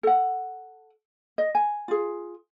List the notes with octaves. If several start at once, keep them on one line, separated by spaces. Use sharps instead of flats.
A4 F#5
D#5
G#5
F4 G#4